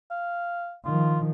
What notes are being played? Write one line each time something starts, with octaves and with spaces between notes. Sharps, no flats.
F5
D#3 F3 F4